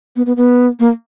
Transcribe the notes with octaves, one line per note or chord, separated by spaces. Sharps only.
B3
B3
B3
A#3